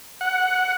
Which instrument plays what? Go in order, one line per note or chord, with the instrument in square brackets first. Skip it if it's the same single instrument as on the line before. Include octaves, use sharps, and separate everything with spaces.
[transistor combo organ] F#5